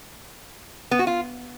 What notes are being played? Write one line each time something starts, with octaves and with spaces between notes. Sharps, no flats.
B3
F#4
F4